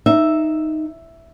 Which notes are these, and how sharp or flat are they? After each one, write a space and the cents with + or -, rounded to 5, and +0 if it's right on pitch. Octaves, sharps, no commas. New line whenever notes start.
D#4 +0 E5 +0